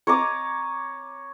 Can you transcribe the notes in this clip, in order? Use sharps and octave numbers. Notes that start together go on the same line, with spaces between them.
C#5 A#5 D6 D#6